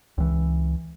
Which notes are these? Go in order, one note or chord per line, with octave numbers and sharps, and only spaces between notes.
C#2 E3